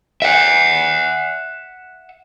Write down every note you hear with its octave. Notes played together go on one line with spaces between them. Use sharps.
E5 F#5